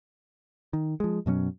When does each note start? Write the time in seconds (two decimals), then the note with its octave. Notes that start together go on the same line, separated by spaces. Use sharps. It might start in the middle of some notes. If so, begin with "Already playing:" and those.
0.73 D#3
1.00 F3 G#3
1.26 F#2 B2 F#3 C#4